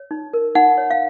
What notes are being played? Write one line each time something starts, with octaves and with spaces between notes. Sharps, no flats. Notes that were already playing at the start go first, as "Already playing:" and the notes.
Already playing: C#5
D#4
A#4
D#4 F#5
C#5
F5